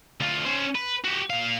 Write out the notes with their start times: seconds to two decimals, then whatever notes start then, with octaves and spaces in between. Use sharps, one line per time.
0.20 D2 F4
0.45 C#4 C5
0.75 B4
1.04 F#4 G4
1.30 A#2 F5